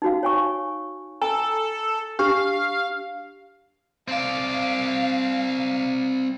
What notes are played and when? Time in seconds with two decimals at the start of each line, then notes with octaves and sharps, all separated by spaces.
0.02 D#4 F#4 F5
0.23 C#5 G#5 C#6
1.22 A4 G#5 A#5
2.19 D4 G4 F5 C#6
4.08 C4 D5 F5